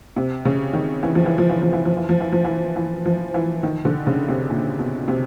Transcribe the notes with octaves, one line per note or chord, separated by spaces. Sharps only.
C3
C#3
D#3
E3
F3
E3
F3
E3
F3
E3
F3
E3
F3
E3
F3
E3
E3
F3
E3
D#3
D3
C#3
C3
A#2
B2
C3